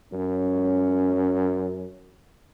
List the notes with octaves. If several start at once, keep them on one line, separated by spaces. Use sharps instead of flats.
F#2 C#4